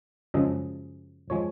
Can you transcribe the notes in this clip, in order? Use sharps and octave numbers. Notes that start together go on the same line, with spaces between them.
F#2 C#3 F3 G#3 D#5
F3 G#3 C#5